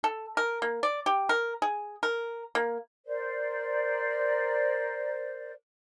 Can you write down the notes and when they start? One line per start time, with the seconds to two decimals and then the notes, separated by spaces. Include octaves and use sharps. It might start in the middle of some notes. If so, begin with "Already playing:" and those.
0.04 A4
0.37 A#4
0.62 A#3
0.83 D5
1.06 G4
1.29 A#4
1.62 G#4
2.03 A#4
2.55 A#3
3.06 A#4 C5 D5